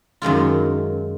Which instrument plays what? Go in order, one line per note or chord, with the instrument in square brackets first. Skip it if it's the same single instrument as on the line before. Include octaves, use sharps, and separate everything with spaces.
[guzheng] F#2 D#3 G#3 F4